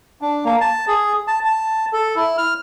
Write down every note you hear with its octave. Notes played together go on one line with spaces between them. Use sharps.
D4
A#3
A5
G#4
A5
A5
A4
E4
F6